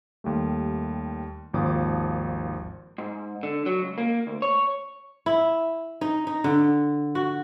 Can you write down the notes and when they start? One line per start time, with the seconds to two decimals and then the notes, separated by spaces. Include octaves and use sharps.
0.24 D#2 G3 A3
1.53 G#1 D#2 F3 D6 D#6
2.98 G#2
3.43 D3
3.66 F#3
3.82 C#2
3.98 A#3
4.27 D2
4.42 C#5
5.26 E4
6.01 D#4
6.27 D#4
6.44 D3
7.15 F#4